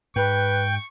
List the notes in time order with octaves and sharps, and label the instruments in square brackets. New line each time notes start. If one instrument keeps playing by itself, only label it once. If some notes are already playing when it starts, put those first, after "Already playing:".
[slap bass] G#2 [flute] B4 [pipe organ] G5 [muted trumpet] C#6